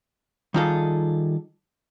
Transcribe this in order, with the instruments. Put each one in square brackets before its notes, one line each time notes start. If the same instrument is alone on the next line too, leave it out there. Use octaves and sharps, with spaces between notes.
[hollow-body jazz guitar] D#3 G3 D#4 F4 G#4 A4